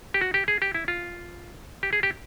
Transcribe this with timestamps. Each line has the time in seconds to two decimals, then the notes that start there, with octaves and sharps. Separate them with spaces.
0.14 G4
0.21 F#4
0.34 G4
0.48 G#4
0.62 G4
0.74 E4
0.88 F4
1.83 G4
1.93 G#4
2.03 G4